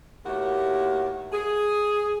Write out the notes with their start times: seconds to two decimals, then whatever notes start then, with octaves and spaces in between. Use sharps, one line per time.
0.25 D#2 A2 A#3 F#4 G4
1.32 G#4